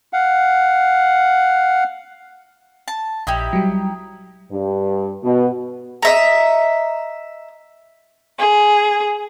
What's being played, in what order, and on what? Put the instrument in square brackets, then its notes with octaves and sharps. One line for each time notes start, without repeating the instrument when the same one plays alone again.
[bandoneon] F5 F#5
[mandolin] A5
[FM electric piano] A#1 [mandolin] D#4 E4 G4
[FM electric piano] F#3 G3
[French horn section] G2
B2
[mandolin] D#5 E5 A#5
[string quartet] G#4